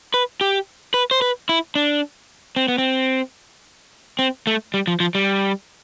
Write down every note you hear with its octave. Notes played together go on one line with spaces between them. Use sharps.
B4
G4
B4
C5
B4
E4
D4
C4
B3
C4
C4
A3
G3
F3
F3
G3